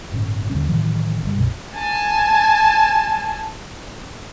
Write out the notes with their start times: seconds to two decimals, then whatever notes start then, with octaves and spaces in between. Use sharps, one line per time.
0.12 G1 A2 C#4
0.50 D#2 D3 G3 C#4
0.68 A2 D#3 E3 F#3
1.22 G1 C#3 G3
1.36 C2 F#2 B2
1.75 G#5 A5